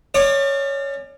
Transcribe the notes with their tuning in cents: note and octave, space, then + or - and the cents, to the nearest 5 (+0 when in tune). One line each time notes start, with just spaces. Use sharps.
C#4 +0 D5 +35